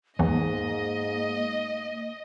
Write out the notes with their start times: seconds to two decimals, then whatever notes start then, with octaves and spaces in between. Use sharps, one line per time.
0.19 E2 G#2 E3 A#3 D#5